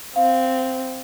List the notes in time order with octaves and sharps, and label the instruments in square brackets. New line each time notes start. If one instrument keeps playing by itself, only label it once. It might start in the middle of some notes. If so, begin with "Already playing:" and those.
[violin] C4 [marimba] F5